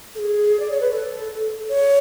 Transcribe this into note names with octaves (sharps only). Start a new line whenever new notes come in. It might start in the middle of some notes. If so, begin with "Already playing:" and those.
A4
G#4
D5
C#5
B4
A4
C#5